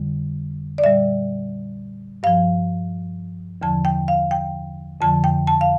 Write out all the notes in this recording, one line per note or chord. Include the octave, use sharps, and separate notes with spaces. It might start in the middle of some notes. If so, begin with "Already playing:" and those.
Already playing: F2 D3 G3
D5
A#2 G3 E5
G2 F3 F5
E2 D3 F3 A5
G5
F5
G5
F2 D3 F3 A5
G5
A5
F5